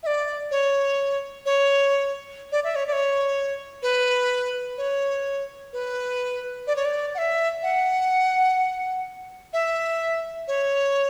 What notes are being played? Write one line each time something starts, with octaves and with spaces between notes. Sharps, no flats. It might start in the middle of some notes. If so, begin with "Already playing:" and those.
E5
D5
C#5
C#5
D5
E5
C#5
D5
C#5
B4
C#5
B4
D5
C#5
D5
F#5
E5
F#5
E5
C#5